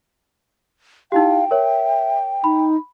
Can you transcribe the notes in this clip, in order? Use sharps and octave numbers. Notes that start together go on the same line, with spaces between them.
D#4 E4 G4 F5 G5
A#4 C#5 E5
D#4 B5